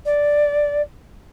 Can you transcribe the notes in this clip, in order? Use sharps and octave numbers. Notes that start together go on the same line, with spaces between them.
D5